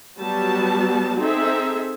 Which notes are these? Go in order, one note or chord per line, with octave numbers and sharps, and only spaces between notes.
F#3 G3 B3 F#4 A5
C4 D#4 G#4 A4 E5